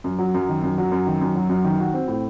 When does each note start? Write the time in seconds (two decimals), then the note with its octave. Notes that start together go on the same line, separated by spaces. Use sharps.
0.04 F#2
0.19 F#3
0.34 F#2
0.49 D#3
0.63 F#2
0.78 F#3
0.92 F#2
1.07 D#3
1.21 F#2
1.36 F#3
1.49 F#2
1.65 D#3
1.80 F#4
1.94 C4
2.08 A2